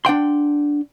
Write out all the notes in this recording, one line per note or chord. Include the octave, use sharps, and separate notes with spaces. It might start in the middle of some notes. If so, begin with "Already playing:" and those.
D4 F#5 G5 C6